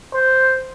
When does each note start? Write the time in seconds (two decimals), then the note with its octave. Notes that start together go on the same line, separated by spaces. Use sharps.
0.14 C5